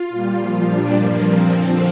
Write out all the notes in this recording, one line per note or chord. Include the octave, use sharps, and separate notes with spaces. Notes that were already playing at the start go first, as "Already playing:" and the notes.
Already playing: F4
A#2 G3
A#2 F3 F4
A#2 G3 D4
G2 F3 A#3
A#2 F3 C4
F2 D3 F3 C4